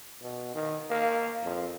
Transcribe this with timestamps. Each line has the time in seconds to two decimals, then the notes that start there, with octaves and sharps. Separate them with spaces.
0.22 B2
0.55 D#3
0.90 A#3
1.44 F2